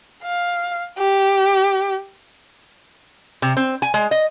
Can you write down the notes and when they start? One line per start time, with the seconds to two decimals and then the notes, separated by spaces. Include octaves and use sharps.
0.24 F5
0.99 G4
3.42 C3
3.57 C4
3.82 G#5
3.94 G#3
4.11 D#5